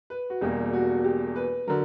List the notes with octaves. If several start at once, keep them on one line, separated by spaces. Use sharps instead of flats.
B4
F#4
E1 E2 B2 G3 A#3 G4
F#4
G4
B4
D3 F#3 A#4